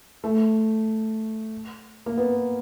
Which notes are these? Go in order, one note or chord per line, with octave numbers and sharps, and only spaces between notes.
A3
A#3
B3